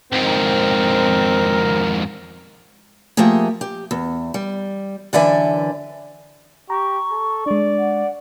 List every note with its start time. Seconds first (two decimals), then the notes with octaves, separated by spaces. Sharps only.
0.12 F2 G#2 C4 A#4
3.17 F3 A3 A#3 G4 G#4
3.61 G4
3.91 E2
4.34 G3
5.13 F#2 D3 E3 D5 E5 G#5
6.70 G4 A#5 C#6
7.11 A4
7.46 G#3 D4 D5
7.78 F#5